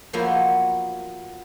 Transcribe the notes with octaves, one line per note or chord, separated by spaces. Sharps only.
F3 F#3 A#3 B3 E4 F#4